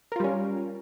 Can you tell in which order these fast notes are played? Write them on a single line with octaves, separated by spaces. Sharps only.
A#4 F4 G3 C#4